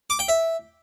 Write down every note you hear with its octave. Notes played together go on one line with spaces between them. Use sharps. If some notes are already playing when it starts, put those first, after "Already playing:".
D6
G5
E5